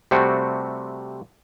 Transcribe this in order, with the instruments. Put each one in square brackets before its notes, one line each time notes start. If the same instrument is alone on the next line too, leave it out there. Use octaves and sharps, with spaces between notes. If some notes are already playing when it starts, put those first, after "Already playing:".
[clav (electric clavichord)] C3 G3 A3 C4 F#4